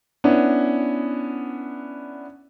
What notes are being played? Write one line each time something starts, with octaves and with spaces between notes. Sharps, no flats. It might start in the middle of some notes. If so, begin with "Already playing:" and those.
B3 C#4 D4 E4